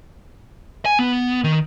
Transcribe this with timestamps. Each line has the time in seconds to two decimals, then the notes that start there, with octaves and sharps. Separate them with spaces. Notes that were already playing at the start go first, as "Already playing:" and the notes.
0.85 G#5
0.99 B3
1.44 D#3